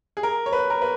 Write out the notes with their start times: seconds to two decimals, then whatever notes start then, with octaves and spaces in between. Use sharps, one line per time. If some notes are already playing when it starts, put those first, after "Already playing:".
0.17 G#4
0.23 A#4
0.46 C#5
0.53 B4
0.70 A#4
0.82 B4